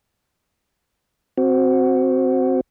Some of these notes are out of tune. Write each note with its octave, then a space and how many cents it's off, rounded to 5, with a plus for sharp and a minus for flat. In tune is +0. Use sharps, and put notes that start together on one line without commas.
C4 +0 F#4 +0